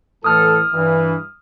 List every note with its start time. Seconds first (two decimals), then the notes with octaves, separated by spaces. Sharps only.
0.24 A2 E3 A4 D#6 F6
0.73 G2 E3